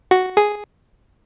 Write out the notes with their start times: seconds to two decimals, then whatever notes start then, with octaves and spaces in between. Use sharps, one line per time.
0.11 F#4
0.37 G#4